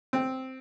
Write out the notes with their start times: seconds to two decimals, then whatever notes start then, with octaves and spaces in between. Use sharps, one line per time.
0.13 C4